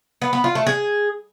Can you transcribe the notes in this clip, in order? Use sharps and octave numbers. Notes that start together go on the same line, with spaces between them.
B3
B3
F4
A3
G#4